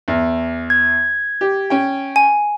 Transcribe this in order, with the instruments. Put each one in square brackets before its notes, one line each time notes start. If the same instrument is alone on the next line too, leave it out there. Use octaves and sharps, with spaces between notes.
[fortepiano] E2
[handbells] G#6
[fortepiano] G4
C#4 G5
[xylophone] G#5